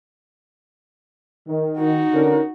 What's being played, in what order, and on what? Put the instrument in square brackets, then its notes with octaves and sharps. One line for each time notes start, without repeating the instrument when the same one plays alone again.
[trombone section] D#3
[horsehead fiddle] D#4 F#4
[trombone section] D3 C#4 A#4